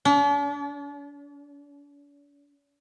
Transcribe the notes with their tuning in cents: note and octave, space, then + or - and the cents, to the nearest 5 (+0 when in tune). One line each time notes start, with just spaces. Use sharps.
D4 -45